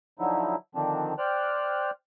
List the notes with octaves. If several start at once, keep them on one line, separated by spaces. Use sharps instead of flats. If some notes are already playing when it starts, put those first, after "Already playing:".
D3 F3 F#3 D#4 E4
D3 D#3 F3 C4 D4
C5 D5 G5 F6 F#6